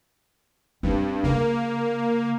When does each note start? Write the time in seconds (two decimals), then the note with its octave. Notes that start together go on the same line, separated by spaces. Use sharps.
0.83 G2 C4
1.23 C#3 A#3